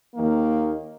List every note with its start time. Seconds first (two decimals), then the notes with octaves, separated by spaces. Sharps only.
0.15 D#2 D#3 A#3